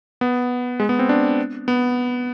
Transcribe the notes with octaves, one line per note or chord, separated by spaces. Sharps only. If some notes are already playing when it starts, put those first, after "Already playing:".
B3
G#3
B3
C4
D4
B3